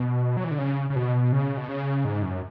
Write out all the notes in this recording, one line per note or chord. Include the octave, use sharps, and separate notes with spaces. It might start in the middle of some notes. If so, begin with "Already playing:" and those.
Already playing: B2
F#3
E3
D3
C#3
C#3
B2
C#3
B2
C#3
G#2
F#2